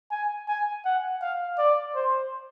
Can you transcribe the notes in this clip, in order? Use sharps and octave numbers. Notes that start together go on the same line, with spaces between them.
G#5
G#5
F#5
F5
D5
C5